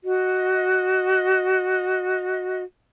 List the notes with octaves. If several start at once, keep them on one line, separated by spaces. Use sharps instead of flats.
F#4 D#5